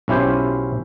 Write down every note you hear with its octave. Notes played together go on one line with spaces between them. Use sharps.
B1 C#4 E4 G4 C5